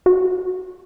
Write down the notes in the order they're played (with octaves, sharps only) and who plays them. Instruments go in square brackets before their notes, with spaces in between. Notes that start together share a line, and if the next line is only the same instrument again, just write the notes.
[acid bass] F#4